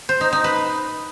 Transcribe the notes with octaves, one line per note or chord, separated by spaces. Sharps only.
C5
D#4
D#4
B4